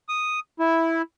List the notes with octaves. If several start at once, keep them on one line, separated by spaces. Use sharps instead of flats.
D#6
E4